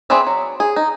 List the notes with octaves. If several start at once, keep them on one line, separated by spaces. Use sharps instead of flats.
C4 G#4 B4 D5 E5
F#3
G#4
D#4